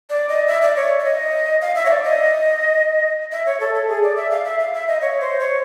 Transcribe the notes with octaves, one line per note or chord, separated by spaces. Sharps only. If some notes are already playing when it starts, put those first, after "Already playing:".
D5
D#5
E5
D5
C#5
E5
D#5
F5
E5
C#5
D5
D#5
E5
C#5
A4
A4
G#4
D5
E5
F5
E5
F5
E5
D#5
C#5
C5
C#5